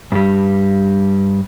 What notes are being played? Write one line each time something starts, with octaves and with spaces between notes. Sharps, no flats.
G2 G3